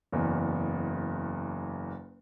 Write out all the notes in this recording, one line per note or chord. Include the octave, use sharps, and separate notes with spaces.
F#1 E2